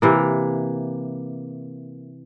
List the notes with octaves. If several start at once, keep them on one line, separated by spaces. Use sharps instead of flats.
C3 E3 A#3